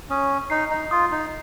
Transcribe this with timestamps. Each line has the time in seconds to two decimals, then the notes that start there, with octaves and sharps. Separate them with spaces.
0.10 C#4 D#6
0.50 D#4 C7
0.70 D#4
0.91 F4 D#6
1.12 D#4